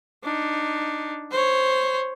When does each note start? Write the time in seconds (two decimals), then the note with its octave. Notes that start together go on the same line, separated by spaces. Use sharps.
0.24 D4 D#4
1.32 C5 C#5